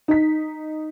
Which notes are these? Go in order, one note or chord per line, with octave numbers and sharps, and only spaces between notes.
D#4 B6